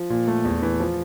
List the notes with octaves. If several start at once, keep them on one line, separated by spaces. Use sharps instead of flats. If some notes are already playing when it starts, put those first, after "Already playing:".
Already playing: F3
A#2
A3
E2
E3
F3